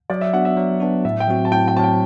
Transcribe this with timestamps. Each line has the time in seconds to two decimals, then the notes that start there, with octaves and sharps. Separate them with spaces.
0.10 F#3 D5
0.21 E5
0.33 B3 D4 F#4 F#5
0.45 E5
0.57 F#3
0.80 B3 D4 F#4
1.05 A2 E5
1.20 G5
1.28 F#3 C4 F#4
1.45 A5
1.52 A2 G5
1.68 G5
1.76 F#3 C4 F#4 A5
1.84 G5